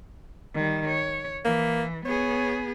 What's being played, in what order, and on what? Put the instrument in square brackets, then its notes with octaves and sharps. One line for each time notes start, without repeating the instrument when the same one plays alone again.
[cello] D#3 G3
C#5
[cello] E3 [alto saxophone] A#3
[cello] B3 G#4 [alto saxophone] C#5